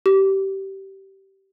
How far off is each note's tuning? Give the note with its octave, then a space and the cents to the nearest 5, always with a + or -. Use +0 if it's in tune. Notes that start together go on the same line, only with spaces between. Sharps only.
G4 -20